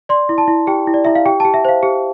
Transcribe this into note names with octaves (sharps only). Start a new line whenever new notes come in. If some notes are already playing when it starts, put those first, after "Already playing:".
D5 C6
E4
A5
E4
G4 G5
E4
D5
E4 E5
F5
G4 G5
G4 A5
E5
C5 F5
G4